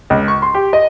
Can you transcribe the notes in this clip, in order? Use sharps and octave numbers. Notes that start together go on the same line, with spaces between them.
C#2
C#6
C6
G4
D#5